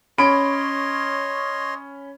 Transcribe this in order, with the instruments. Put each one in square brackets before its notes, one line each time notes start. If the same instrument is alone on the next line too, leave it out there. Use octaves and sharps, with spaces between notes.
[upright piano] C#4 B5 D7 [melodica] C#5 D#5 C6